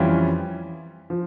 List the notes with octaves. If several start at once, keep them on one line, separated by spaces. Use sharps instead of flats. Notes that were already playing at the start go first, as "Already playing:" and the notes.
Already playing: F2 E3 G3 C#4 F4
F3